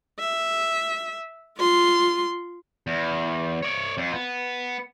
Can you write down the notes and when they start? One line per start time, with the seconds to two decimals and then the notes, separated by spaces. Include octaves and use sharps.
0.20 E5
1.58 F4 C6
2.87 E2
3.63 C#5 D5
3.97 F2
4.13 B3